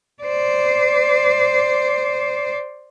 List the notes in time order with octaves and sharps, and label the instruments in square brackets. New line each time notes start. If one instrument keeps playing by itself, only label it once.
[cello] C5 D5